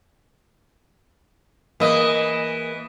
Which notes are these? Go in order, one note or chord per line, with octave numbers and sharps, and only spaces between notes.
E3 A#3 G#4 D#5